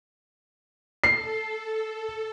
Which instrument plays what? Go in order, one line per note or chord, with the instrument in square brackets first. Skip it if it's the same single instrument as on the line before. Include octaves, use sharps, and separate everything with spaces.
[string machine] A4 [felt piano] C7